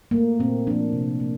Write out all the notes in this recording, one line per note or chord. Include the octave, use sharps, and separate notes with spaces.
A3 A#3
A#2 C4
F3 A#3 D4
C3
A#3